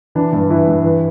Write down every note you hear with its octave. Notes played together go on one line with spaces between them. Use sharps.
E3 D4
G2
E3 E4
G2
E3